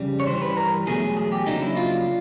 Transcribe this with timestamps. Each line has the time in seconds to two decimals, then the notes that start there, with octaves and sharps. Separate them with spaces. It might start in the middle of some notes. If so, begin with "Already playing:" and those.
Already playing: F2 C#3 G3
0.20 C#5
0.26 G2 E3 G3 C5
0.42 B4
0.57 A#4
0.87 E2 B2 F#3 A3 G#4
1.17 G#4
1.32 G4
1.47 F2 C#3 F#3 A#3 D4 D#4
1.62 E4
1.77 F4